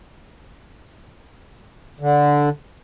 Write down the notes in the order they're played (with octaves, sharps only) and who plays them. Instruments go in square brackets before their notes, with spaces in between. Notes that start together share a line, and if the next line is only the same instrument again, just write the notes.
[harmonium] D3